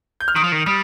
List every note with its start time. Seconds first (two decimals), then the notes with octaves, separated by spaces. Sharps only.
0.20 G6
0.28 F6
0.36 D#3 D#6
0.44 F3
0.52 D#3
0.66 G3 D#6